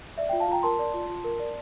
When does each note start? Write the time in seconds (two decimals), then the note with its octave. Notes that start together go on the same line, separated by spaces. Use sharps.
0.18 D5 E5
0.29 F4 E5 G5
0.40 F5 A5
0.48 F4 G5 A#5
0.63 A#4 A5 C6
0.79 D5
0.94 F4
1.09 F4
1.24 A#4
1.40 D5